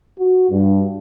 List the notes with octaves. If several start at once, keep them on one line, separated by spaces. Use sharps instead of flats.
F#4
G2